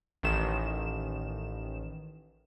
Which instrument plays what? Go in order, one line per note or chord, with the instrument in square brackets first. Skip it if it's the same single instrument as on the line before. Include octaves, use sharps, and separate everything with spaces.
[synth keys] A1 D#3 E7